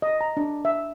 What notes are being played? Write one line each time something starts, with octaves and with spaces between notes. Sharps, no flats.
D#5
A#5
D4
E5